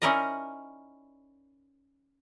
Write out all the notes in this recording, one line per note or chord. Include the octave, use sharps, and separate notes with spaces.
C#4 D#4 E4 A#4 D5 D#5